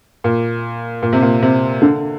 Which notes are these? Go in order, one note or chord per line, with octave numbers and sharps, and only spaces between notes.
A#2
A#2
C3
A#2
C3
D3